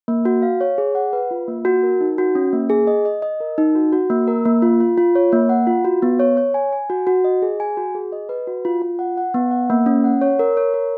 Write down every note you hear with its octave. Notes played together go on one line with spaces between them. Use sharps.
A#3
F#4
F5
C#5
G#4
F#5
B4
F4
A#3
F#4
A#4
D#4
F#4
C#4
A#3
G#4
D#5
D#5
D#5
A#4
D#4
F#4
F#4
A#3
A#4
A#3
F4
F4
F4
C#5
A#3
F#5
F4
F#4
B3
C#5
C#5
G#5
G#5
F#4
F#4
D#5
G#4
G#5
F#4
G#4
D#5
B4
F#4
F4
F4
F#5
F#5
B3
F#5
A#3
C#4
F#5
C#5
A#4
C#5
A#4